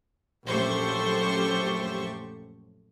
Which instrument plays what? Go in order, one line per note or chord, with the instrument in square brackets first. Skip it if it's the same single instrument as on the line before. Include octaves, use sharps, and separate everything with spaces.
[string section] A#1 F#2 A3 G4 C5 C#6